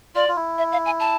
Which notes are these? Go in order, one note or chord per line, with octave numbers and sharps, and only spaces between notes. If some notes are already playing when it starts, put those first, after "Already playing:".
F4 D5
F4
E4
E5
F5
G#5
A5